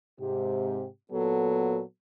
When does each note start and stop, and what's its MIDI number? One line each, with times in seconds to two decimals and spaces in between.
0.20 0.87 44
0.20 0.87 48
0.20 0.87 67
1.12 1.81 46
1.12 1.81 54
1.12 1.81 59
1.12 1.81 69